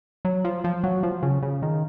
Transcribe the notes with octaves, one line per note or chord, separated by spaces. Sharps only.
F#3
F3
F3
F#3
F3
C#3
C#3
D#3